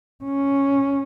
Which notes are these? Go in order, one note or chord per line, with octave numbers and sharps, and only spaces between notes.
C#4